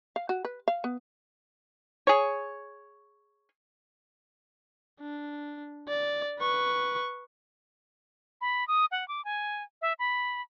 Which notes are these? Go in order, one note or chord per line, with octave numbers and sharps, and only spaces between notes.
F5
F#4
B4
F5
B3
G#4 C#5
D4
D5
B4 C#6
B5
D#6
F#5
D6
G#5
E5
B5